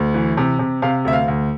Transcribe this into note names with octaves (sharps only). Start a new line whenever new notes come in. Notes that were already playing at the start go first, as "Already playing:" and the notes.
Already playing: D2
E3
C3
C3
C3 F5
D2 E5
F5
D2